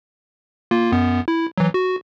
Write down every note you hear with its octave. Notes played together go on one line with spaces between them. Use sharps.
A#3 F4
F#2 B3
E4
E3 F#3
F#4